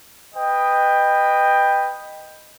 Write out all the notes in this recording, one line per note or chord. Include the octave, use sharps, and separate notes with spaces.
B4 D#5 G5